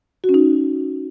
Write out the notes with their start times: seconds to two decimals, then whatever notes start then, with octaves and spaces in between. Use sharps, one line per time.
0.24 F#4
0.29 C#4
0.34 D#4